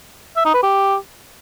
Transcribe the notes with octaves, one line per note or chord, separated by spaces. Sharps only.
E5
D#4
B4
G4